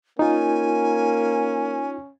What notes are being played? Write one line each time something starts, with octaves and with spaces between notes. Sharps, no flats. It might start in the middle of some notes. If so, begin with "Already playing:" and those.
A#3 C#4 D#4 F4 G#5